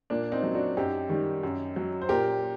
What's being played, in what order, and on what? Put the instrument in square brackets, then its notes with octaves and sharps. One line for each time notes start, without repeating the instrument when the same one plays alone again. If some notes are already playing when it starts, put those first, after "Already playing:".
[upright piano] A#2 A#3 D4
C4 D#4
F#3
D4 F#4
F#2 D#4 G4
D#3 G3
F#2
F#3
C5
A#2 G4 A#4